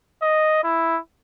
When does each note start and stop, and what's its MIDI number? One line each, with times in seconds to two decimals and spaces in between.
0.22 0.62 75
0.64 0.98 64